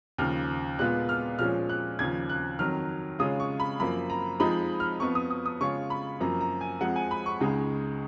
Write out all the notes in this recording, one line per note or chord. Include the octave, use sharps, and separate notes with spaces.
D#2 C#3 F3 F6
A#2 G#3 B3 F4 F#6
F6
A#2 F3 G#3 C#4 F6
F#6
D#2 C#3 F3 G#6
F#6
F2 D#3 F#3 F6
C#3 G#3 C#4 F4 D#6
C#6
B5
F#2 F3 A#3 B5
A#5
F2 F3 G#3 D#4 B5
F6
F2 F3 B3 C#6
D#6
D#6
D#6
C#3 G#3 C#4 F4 C#6
B5
F#2 F3 A#3 A#5
A#5
G#5
F2 F3 G#3 F#5
G#5
B5
C#6
C#2 C#3 G#3 D#4